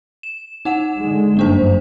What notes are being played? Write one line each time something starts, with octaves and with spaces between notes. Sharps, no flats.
E7
D#4 F#5 E7
D3 G#3
G1 F#2 A#3 D4 C5